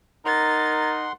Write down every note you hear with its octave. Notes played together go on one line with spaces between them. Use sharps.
D#4 A#4 F#5 C6 A6